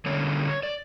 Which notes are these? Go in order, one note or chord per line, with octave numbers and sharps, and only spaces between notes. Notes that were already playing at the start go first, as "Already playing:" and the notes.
D3 G3 A#3 C#4 C#5
D5